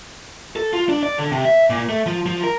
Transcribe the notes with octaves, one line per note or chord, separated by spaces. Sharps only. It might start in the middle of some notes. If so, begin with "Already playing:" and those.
A4
F4
D4
D5
D3
C3
E5
A#2
A3
F3
F3
A#4